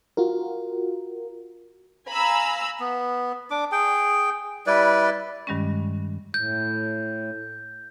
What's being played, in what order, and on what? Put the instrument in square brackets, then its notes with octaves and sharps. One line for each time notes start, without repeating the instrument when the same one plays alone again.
[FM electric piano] F4 F#4 A#4
[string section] F5 G#5 A#5 B5 E6
[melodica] B3
D4 D6
G#4 G5
G3 E4 B4 D5
[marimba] G2 D#3 G3 G#3 C#4
[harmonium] A2 [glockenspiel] G6